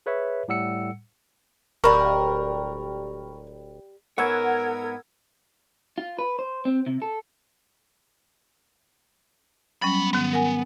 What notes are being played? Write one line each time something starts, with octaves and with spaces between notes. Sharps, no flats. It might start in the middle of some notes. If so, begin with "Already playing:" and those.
G#4 B4 C#5 E5
A2 G3 F#5 E6 C#7
D1 G3 A#4 B4 B5 C#6
G#2 B3 A#4 C#5 F#5 E6 G#6
F4
B4
C5
C4
C3
A4
F#3 G3 B3 C#4 B5
G#2 D#3 B3
A#4 F#5 G#5